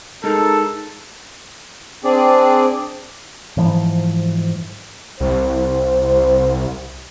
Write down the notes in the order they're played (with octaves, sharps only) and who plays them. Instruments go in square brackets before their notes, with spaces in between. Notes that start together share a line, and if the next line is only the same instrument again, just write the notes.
[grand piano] G#3 A#4 [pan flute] D#4 [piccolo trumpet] A4
[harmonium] C4 D4 G#4 D5
[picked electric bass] G#2 E3 F3
[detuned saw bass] C2 [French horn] C5